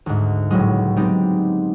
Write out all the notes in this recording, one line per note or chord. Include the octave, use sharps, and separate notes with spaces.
D2 G#2
C#2 A2 F#3 G#3
G#3 B3 C4 D#4 G4